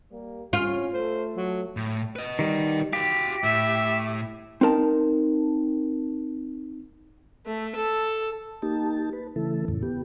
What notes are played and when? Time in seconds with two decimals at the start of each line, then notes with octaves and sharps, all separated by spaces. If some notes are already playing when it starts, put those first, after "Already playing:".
0.11 G3 A#3
0.53 C2 A2 C#4 F4
0.93 A3 A4 C5
1.37 F#3
1.77 A2
2.16 B4 D#5
2.39 D#3 G3
2.93 F#4 G4 F5
3.44 A2 E5
4.61 C4 D#4 A#4 A5
7.46 A3
7.75 A4
8.62 A#3 D#4 G4 A5
9.13 B4
9.36 C#3 E3 A3 E4 A4
9.68 F2 A2 C#3
9.83 B3 G4